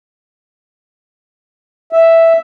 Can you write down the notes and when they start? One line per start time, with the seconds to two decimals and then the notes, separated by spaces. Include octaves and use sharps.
1.93 E5